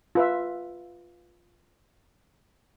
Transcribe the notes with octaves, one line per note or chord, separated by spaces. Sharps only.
F4 B4 E5